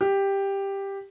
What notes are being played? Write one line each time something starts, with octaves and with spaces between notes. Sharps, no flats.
G4